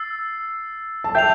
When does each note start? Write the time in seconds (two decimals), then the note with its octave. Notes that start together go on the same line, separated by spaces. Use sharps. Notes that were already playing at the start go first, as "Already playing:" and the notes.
Already playing: E6 A6 C7
1.04 A5
1.15 E5 G5 G6 C7 F7